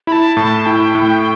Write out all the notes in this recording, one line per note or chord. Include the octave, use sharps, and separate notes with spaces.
E4 A5 B5
A2 A5
E4 G5
A2